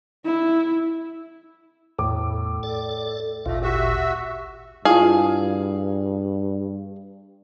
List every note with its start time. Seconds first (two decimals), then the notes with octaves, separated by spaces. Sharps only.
0.25 E4
1.99 E2 A2 D6
2.63 A4 D5
3.46 G#1 D2 A#2 A3 F4
3.62 F#4 G4 E5
4.85 G2 E4 F4 G#4 F5 A5